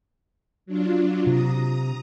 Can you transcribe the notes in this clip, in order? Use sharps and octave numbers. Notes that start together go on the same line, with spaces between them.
F#3 D4 F4
C3 A#5 D#6